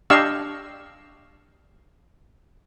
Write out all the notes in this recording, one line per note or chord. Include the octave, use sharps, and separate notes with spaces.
D4 G4 D#5 F5 C#6 E6